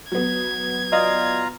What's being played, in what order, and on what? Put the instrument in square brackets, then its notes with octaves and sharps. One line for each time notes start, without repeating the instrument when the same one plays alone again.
[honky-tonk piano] F#3 B3 [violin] G#6
[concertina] F4 A#5 [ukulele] D5 D#5 F5